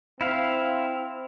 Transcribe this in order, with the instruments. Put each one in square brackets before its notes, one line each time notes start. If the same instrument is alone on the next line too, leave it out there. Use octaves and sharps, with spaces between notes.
[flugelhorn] C4 [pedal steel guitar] E4 F5